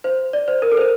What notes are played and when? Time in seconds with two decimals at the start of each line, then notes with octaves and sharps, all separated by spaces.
0.04 C5
0.33 D5
0.48 C5
0.62 A#4
0.72 A4
0.77 C5
0.81 A#4